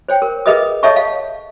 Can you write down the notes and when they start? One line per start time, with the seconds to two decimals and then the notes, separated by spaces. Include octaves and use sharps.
0.08 C5 C#5 G5
0.22 A#4
0.46 G#4 A#4 B4 D#5 E5 D#6
0.83 A4 C#5 D#5 E5 A5 C#6
0.96 F5